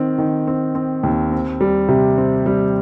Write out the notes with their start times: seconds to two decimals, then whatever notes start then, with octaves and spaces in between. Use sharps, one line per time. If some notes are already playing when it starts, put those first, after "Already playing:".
Already playing: D#3 C4
0.18 D#3
0.47 C4
0.75 C4
1.03 D#2
1.32 C4
1.61 G3
1.89 C3
2.18 C4
2.46 G3